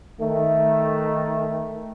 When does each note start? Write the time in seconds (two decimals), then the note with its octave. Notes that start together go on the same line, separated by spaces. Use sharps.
0.21 D#3 A3